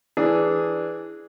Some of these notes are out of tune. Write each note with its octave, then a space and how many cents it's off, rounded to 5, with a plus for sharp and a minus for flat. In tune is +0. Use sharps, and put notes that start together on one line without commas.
E3 +5 D4 +0 G#4 +0